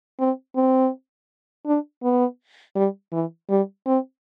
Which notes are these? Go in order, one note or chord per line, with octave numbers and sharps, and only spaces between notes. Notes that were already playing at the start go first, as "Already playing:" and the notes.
C4
C4
D4
B3
G3
E3
G3
C4